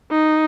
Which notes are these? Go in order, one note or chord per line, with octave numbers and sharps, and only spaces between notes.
D#4